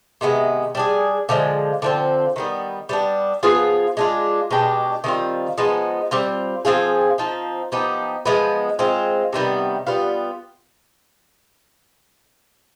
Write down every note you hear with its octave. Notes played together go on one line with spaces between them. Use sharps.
C3 D#3 G#3 B3
G3 D4 G#4
D3 F3 G#3
D3 F3 C4
D#3 G3 B3
G3 B3 D4
F3 B3 F4 G#4
G#3 D4 F4
B2 G#3 D4 G4
D#3 G3 C4 F4
F3 G#3 B3 D#4
G3 C4 F4
F3 C4 F4 G#4
F3 C4 D#4
F3 B3 D#4 G4
F3 G#3 B3
G#3 C4 F4
C3 D#3 G3 B3
G3 B3 F4